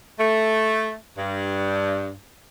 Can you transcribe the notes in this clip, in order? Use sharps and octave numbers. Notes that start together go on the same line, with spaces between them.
A3
G2